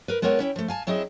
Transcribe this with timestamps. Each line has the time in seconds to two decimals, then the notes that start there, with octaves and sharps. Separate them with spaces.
0.08 A#4 B4
0.22 G#3 B3 C4 A#4 C#5 F#5
0.39 C#4 E4 G5
0.56 F3 A3
0.68 F5 G#5 A5
0.87 F#3 C4 E4 G#4 D#5